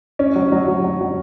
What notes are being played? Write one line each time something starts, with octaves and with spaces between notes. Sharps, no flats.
C#4
F#3
F#3
F#3
F#3
F#3